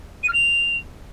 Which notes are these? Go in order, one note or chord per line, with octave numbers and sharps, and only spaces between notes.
D#7
F6
F7